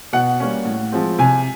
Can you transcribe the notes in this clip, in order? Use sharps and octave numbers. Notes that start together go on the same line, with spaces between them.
B2 F#5
G3 A#3 C#4
A2
F3 G#3 C4
C3 G#5